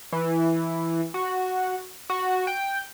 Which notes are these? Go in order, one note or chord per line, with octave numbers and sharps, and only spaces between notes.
E3
F#4
F#4
G5